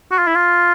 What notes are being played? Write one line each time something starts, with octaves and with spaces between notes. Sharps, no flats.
F#4
F4
E4
F4